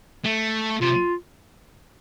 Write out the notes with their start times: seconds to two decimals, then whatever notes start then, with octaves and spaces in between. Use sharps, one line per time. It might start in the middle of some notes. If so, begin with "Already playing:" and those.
0.24 A3
0.81 C3 F4